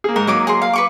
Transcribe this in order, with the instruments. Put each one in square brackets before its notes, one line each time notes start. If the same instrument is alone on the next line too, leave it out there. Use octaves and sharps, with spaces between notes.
[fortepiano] A#3 G#4
[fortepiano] G#2 [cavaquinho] A#4
[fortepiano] F#3 A#3 [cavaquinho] D#4 D6 D#6
[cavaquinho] G#4 A#4 C6
F5
B4 C#6 D6